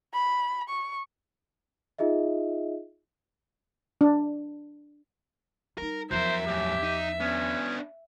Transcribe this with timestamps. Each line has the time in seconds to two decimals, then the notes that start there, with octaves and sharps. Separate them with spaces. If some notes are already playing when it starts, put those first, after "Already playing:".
0.14 B5
0.69 C#6
1.99 D#4 F4 G#4 D#5 E5
4.01 D4
5.78 G3 D#4 A#4
6.11 E2 F3 F#3 A#4 C5 E5
6.46 F#2 A2 G4
6.83 D#4
7.21 B3 C#4 D4